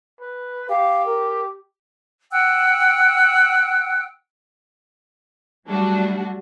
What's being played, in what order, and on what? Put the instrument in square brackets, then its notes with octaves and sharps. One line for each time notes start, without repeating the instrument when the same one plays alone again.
[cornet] B4
[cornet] G4 [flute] F5
[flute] A#4
[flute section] F#5 G5 E6 F#6
[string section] F#3 G3 A3 D4 F#4